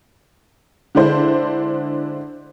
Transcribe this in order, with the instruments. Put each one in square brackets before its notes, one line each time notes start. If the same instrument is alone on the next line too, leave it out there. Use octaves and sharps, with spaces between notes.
[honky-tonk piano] D3 G#3 D4 E4 C5